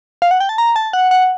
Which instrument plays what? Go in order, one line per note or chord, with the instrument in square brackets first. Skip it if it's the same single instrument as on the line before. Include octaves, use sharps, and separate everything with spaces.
[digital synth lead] F5
F#5
G5
A5
A#5
A5
F#5
F#5